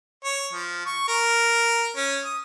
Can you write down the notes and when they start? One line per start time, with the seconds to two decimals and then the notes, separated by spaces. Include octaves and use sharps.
0.25 C#5
0.53 F3
0.86 C#6
1.08 A#4
1.97 C#4
2.25 D#6